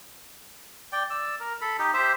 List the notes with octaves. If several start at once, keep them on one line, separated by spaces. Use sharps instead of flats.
D5 G5
D5 E6
A#4
A4 B5
D#4 G4
G4 C5 E5